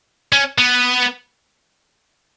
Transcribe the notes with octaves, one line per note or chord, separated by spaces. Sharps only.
C#4
B3